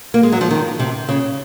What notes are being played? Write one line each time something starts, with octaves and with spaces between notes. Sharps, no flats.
A#3
G#3
F#3
F3
D#3
C3
C#3